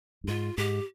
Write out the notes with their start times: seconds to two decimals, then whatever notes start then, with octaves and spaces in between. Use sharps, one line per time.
0.24 G2
0.28 G#2 F4
0.57 G#2 G4